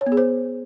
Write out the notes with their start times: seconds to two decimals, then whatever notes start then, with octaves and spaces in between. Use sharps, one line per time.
0.01 C#5
0.06 B3
0.12 G#4
0.17 C5